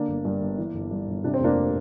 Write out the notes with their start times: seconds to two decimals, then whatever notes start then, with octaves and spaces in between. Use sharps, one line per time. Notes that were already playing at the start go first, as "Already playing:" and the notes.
Already playing: D3 A#3 D4
0.08 G1
0.25 G2
0.41 G1
0.58 E3
0.74 G1
0.91 G2
1.08 G1
1.24 C3 D4
1.34 C4
1.40 F1 A#3 D4